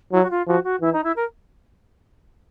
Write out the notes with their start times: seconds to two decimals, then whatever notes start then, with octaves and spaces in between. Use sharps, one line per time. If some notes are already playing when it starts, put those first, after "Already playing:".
0.12 F#3 E4
0.22 F#4
0.30 F4
0.47 F3 F#4
0.64 F#4
0.81 E3 E4
0.93 D#4
1.04 E4
1.16 A#4